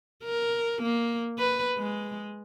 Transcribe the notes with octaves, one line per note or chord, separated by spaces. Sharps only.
A#4
A#3
B4
G#3